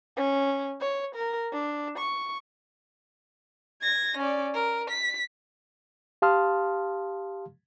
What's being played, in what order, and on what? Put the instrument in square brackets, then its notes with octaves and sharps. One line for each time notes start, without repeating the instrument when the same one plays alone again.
[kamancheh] C#4
C#5
A#4
D4
C#6
[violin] G#6 A#6
C#4 D5
A#4
B6
[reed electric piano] G4 F5 A5 C6 D#6 F6